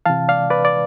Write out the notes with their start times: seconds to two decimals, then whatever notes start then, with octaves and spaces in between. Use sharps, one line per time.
0.06 C3 E3 F5 A5
0.29 D5 F5
0.50 B4 D5
0.65 D5